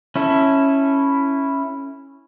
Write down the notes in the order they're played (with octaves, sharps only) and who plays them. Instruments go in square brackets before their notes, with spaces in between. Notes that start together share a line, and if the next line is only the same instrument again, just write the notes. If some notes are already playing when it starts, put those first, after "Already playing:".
[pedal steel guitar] C#4 E4 A4